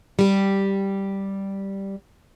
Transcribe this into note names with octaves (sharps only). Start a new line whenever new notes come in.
G3 G4